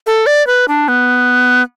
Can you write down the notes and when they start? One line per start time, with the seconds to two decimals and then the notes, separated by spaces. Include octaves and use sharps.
0.06 A4
0.26 D5
0.47 B4
0.68 D4
0.88 B3